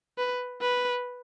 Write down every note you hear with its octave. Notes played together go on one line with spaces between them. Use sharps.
B4
B4